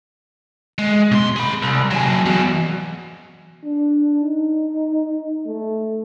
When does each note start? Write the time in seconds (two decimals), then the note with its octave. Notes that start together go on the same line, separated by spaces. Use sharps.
0.78 G#3
1.12 B2 C6
1.36 G#4 B5
1.62 C2
1.91 F#3 G#4
2.25 E2 B2
3.64 D4
4.21 D#4
5.47 A3